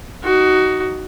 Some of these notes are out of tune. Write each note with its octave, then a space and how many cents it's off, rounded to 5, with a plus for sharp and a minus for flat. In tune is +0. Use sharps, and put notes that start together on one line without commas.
D#4 +0 F#4 +20